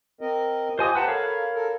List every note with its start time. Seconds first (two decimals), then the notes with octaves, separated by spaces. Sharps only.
0.21 C4 A#4 D#5
0.79 F4 G4 C5 D#5 G#5 D#6
0.95 B4 C5 F#5 G5 A5 A#5
1.08 A4 A#4 C#5 F5 B5
1.54 A4 A#4